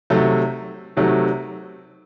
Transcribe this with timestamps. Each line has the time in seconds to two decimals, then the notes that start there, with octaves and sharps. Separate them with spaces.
0.10 C3 D#3 F#3 A3
0.97 C3 D#3 F#3 A3